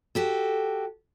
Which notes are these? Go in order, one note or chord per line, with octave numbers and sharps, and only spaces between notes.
F#4 G4 A4